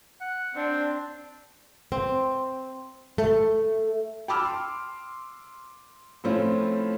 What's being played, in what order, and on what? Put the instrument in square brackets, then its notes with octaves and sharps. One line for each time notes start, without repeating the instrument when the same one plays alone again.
[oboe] F#5
[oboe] C4 [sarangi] D4
[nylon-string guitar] C4
A3
[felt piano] G5 A5 B5 D6 E6 F6
C6
A2 F3 A3 C4 C#4 F4